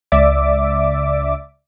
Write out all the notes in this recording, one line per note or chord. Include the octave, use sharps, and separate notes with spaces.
C#2 D5 E5 D6